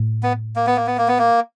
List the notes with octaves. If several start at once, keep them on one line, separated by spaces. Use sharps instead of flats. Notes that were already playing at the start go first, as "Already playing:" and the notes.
Already playing: A2
B3
A#3
B3
A#3
B3
A#3
B3
A#3